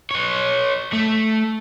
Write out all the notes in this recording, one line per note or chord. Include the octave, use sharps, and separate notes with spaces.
B4 C#5
A3